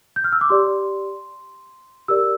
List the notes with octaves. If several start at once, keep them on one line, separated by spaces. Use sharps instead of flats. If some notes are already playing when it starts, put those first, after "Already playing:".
G6
F6
E6
D6
G4 D5 C6
G4 A#4 D5 E6